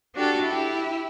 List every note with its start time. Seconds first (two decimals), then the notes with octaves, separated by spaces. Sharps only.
0.14 D4 F#4 G4 A4
0.43 E4 G4